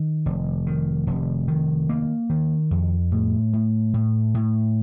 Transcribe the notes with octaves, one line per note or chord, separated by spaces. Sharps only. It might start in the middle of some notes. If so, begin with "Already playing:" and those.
Already playing: D#3
F1
D#3
F1
D#3
A#3
D#3
F2
A2
A2
A2
A2